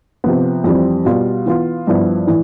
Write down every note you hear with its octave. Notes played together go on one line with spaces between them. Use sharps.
C3 F3 B3
F2 E3 G3 C4
B2 G3 B3 F4
E3 B3 F4
G2 F3 B3 E4
A2 E3